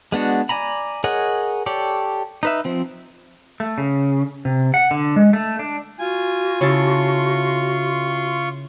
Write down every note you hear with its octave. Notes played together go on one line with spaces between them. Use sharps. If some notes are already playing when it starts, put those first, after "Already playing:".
G#3 B3 D4 F#4
D5 G#5 A#5 B5
G#4 A#4 C#5 D#5 F#5
G4 A4 C#5 D5
D#4 B4 E5
F3 C4
A3
C#3
C3
F#5
D3
G#3
A3
D4
F4 F#4 G#5
C#3 E4 F4 A5 C6 C#6